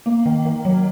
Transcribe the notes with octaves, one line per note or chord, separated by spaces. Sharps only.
A#3
D#3
D#3
F#3